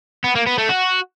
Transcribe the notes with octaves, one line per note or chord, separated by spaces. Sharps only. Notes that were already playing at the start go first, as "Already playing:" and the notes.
B3
A#3
B3
A3
F#4